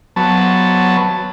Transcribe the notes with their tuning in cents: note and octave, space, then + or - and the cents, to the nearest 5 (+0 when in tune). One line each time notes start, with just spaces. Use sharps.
F#3 +0 B3 +5 A5 +0